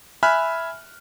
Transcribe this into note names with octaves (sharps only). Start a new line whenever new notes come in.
E5 G#5 B5 F6 F#6